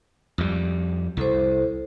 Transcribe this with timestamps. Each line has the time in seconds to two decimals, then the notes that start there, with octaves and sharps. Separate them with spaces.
0.38 F2 G3
1.17 C2 E4 A4 C5